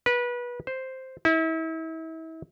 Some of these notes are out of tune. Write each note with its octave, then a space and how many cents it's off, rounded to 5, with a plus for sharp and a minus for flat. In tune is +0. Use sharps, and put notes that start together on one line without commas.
B4 -25
C5 +0
E4 -35